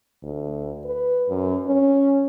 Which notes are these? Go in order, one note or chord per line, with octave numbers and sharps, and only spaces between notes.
D2
B4
F#2
C#4